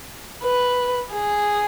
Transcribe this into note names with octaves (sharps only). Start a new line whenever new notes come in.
B4
G#4